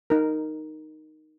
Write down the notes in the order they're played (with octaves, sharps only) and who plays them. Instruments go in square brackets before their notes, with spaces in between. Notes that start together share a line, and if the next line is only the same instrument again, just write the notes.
[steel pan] D#4 A#4